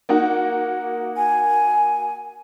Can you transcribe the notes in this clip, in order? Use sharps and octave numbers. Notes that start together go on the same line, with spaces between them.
A#3 D#4 F#4
G#5